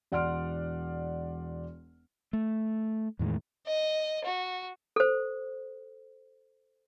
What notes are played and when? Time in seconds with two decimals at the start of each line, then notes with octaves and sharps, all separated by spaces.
0.12 E1 D5 F#5 C6 F6 D7
2.33 A3
3.19 E2 A2 D#3 G#3
3.67 D#5
4.25 F#4
4.96 A4 C5